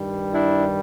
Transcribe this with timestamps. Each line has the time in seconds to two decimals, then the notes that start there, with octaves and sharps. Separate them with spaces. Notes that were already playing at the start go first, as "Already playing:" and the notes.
Already playing: G2 D#3 G3
0.33 D4 E4